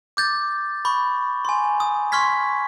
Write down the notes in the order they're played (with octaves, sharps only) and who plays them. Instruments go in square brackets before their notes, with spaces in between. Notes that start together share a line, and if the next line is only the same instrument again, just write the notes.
[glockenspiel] D6 G6 A6
B5 C#6 G6
G#5 C6
D#6
C6 C#6 F6 G#6 B6